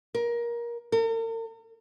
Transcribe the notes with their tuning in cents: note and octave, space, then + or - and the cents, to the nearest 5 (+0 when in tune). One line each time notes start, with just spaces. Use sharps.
A#4 +20
A#4 -45